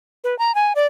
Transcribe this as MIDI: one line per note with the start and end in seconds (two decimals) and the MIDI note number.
0.24 0.37 71
0.39 0.54 82
0.55 0.73 80
0.76 0.87 74